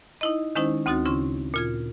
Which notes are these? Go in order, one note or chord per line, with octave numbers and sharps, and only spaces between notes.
D#4 E4 D#5
D#3 G#3 C#4 D#4 E4 C5
D2 C4 D#4 F#4 A6
C#3 C#4 E4 C6 C#6
A#2 F4 G#6